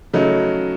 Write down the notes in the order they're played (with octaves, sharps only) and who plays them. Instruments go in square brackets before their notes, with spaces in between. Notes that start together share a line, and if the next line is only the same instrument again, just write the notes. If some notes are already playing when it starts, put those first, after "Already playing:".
[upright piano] C#3 F#3 A3 D#4